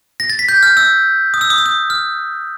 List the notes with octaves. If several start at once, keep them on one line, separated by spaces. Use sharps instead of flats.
A#6
A6
B6
G6
F6
E6
D#6
E6
D#6
E6
D#6
F6